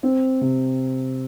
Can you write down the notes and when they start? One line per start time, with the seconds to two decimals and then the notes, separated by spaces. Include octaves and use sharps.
0.03 C4
0.41 C3